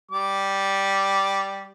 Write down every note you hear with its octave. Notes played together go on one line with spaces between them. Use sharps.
G3 D6